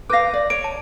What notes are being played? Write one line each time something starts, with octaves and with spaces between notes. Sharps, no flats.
B4 F5 D6 G6 A#6
D5
C#5 D7
A5 D7